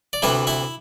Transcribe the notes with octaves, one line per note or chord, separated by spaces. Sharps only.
D5
D2 C3 E3 B3 E4 E5
E4 E5